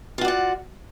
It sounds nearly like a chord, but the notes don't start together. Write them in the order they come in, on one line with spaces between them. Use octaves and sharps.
F4 F#4 D5 F#5